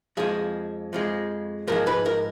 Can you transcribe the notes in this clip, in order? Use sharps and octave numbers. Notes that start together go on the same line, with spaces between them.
F2 F3 G#3 G#4
F2 F3 G#3
G#2 F3 G#3 A#4
B4
A#4